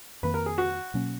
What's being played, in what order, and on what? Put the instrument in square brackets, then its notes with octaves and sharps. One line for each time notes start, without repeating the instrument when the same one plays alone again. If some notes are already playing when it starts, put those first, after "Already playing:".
[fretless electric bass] F2 D#3 A#3 [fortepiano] B4
[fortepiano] A#4
G#4
F#4
[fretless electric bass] B2 F#3 A#3 C#4